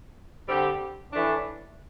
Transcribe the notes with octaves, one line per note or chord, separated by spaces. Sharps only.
D3 G3 C4 G4
A2 E3 A3 D4